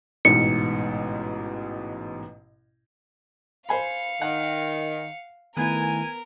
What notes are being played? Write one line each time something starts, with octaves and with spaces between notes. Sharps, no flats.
A1 G#2 B2 C#7
C5 F5 G#5 B5 C#7
D#3 F#5
D#3 A3 B3 E4 A#4 G#5